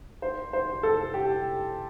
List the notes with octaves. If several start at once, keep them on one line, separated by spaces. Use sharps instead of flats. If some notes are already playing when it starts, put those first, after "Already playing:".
C5
C5
A4
G4